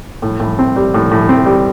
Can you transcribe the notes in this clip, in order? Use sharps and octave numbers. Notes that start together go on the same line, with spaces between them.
A2
A2
C4
G3
A2
A2
C4
G3